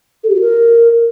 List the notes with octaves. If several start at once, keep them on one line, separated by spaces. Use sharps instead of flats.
A4
G4
F#4
A#4